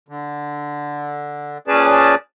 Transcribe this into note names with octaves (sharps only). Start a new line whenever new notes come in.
D3
A#2 C#4 G#4 B4 D5 A5